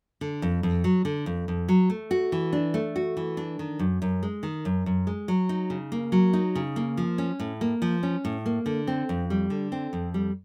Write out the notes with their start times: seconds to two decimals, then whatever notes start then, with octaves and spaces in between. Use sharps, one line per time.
0.21 D3
0.42 F2
0.63 F2
0.84 F#3
1.05 D3
1.26 F2
1.48 F2
1.69 F#3
1.90 A3
2.11 F#4
2.32 E3
2.53 D4
2.74 A3
2.96 F#4
3.17 E3
3.37 D4
3.59 D#3
3.79 F#2
4.02 F#2
4.23 G#3
4.43 D#3
4.65 F#2
4.86 F#2
5.07 G#3
5.28 F#3
5.49 D#4
5.70 C#3
5.92 A#3
6.12 F#3
6.33 D#4
6.55 C#3
6.76 A#3
6.97 F3
7.18 C#4
7.40 A2
7.61 A#3
7.82 F3
8.03 C#4
8.25 A2
8.46 A#3
8.66 D3
8.87 C4
9.09 F2
9.30 G3
9.50 D3
9.72 C4
9.93 F2
10.14 G3